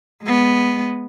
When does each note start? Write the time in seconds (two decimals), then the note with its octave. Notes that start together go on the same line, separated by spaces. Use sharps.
0.23 G#3 B3